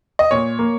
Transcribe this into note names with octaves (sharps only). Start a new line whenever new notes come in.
D#5
A#2 C#5
A#3